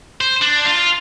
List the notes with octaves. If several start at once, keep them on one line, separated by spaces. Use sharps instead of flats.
C5
D4
F4